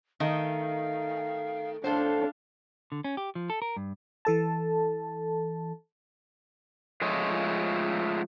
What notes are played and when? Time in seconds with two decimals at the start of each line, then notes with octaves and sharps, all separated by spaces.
0.20 D#3 A3 D#4 F5
1.84 A2 D4 A4 C5 F5
2.92 D3
3.04 C#4
3.17 G4
3.35 F3
3.50 A4
3.62 A#4
3.77 G2
4.25 E3 A4 A5
7.02 F3 G#3 A3 F4 C#5 D#5